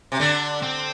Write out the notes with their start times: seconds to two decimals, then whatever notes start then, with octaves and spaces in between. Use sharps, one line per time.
0.12 C3
0.20 D3 D4
0.62 C4